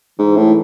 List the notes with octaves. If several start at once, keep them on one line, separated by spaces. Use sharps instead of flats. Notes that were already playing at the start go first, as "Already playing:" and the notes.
G#2 E3
A2